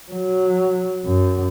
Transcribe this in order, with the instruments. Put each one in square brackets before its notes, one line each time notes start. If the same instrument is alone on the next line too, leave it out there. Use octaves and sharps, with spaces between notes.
[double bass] F#3
F#2